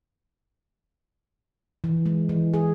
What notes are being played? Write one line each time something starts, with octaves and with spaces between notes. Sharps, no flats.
E3
G#3
E3
G#4